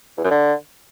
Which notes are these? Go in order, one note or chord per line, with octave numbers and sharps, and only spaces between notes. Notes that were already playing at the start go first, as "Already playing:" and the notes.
E2
F#2
D3